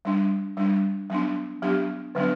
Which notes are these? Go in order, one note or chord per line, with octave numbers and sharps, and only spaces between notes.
G3 D4
G3 D4
F#3 B3 D4
F#3 B3 D4 G4
D3 F#3 B3 D4